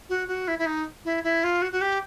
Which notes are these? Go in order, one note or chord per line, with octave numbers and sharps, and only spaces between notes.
F#4
F#4
E4
E4
D#4
E4
E4
F4
F#4
F#4
G4